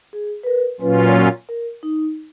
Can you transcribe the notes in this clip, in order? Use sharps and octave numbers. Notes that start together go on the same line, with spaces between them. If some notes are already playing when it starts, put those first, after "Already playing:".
G#4
B4
A#4
A#2 F#3 C#4 F4 B4
A#4
D#4